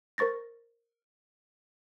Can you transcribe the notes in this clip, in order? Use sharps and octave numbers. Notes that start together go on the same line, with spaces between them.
A#4 C5 C#6 A6 A#6